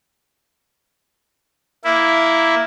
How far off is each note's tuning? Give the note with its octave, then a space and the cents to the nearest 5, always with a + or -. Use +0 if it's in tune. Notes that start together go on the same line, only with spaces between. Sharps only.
A#3 +0 E4 +0